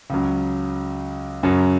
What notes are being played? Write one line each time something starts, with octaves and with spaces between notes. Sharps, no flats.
C#2 C#3 F#3
F#2 C#3 F#3